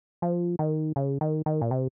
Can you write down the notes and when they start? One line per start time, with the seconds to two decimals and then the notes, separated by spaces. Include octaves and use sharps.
0.22 F3
0.59 D#3
0.96 C#3
1.21 D#3
1.46 D#3
1.61 A#2
1.71 C3